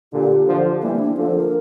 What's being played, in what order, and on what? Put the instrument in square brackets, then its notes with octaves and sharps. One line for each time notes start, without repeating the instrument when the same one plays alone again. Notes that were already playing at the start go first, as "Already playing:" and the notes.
[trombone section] A#2 D3 [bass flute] G4
[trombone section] D3 F3
[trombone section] E3 G3 [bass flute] A#3
[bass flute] C4
D4
[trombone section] D3 F3 [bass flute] A4
[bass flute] A#4